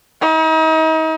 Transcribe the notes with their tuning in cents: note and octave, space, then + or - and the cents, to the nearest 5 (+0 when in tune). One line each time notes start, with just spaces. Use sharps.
D#4 +40